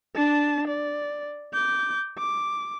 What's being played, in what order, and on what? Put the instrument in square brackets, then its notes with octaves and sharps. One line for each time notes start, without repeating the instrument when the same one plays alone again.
[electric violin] D4 A5
D5
D6 G6
D6